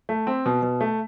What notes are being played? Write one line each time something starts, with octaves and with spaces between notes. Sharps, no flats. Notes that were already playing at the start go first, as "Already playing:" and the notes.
A3
C4
B2
B2
A3